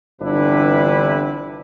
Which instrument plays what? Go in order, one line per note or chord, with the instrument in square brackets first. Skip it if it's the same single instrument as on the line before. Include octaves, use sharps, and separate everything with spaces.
[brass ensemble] G1 C3 E3 D4 E4 B4